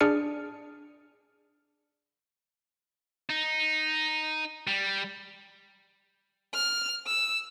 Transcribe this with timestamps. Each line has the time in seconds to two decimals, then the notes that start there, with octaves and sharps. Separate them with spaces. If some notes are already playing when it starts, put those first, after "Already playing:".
0.01 D4 G#4 D5 F6 C#7
3.30 D#4
4.67 G3
6.54 F6
7.07 E6